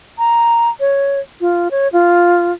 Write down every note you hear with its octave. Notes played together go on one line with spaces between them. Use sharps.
A#5
C#5
F4
C#5
F4